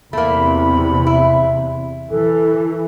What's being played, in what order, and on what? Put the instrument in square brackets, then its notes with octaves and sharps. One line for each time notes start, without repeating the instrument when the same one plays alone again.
[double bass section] E2 C3 [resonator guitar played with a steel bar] A3 A#3 [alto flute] B5
[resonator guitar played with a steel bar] E4
[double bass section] E3 [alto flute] A4